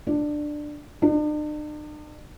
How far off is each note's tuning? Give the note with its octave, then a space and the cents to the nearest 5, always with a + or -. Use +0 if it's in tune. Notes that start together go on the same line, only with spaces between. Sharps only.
D4 +15
D4 +45